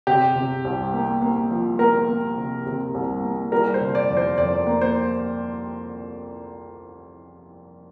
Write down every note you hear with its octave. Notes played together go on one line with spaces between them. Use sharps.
C3 G4
C3
C2
A#3
A#3
F3
A#3 A#4
A#3
C3
C3
C2
A#3
G3 A#4
C5
C3
D5
F2
C5
F2 D5
A#3
C5